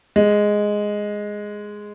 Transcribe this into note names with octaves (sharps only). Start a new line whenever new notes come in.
G#3